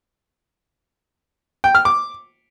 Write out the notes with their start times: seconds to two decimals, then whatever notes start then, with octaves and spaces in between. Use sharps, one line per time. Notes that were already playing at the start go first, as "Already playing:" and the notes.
1.64 G5
1.75 F6
1.85 D6